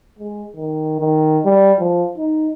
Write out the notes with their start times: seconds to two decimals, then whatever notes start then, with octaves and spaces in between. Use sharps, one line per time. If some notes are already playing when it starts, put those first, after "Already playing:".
0.19 G#3
0.56 D#3
1.00 D#3
1.45 G3
1.79 F3
2.18 D#4